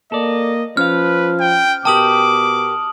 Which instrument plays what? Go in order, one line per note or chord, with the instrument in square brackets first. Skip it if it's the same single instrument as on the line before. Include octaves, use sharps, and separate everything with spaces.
[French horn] A#3 [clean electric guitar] A4 D5 [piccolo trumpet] D#5
[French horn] F3 [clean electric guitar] C#4 F5 [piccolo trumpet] B4 [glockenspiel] F6
[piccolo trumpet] G5
[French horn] B2 [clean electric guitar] G4 A#4 G5 [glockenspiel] A5 D#6 F#7 [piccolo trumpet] D6